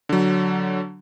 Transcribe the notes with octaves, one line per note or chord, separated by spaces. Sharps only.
D3 F#3